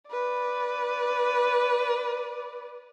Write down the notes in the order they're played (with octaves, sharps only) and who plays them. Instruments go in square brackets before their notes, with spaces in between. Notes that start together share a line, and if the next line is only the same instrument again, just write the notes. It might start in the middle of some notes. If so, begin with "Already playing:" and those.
[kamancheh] B4 D5